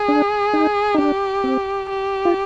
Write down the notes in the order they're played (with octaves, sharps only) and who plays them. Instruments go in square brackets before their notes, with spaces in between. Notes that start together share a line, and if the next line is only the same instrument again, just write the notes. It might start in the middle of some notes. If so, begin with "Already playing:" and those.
Already playing: [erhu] G#4
[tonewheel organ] D4
D#4
D#4
[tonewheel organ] D4 [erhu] G4
[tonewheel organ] C4
[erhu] G4
[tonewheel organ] F4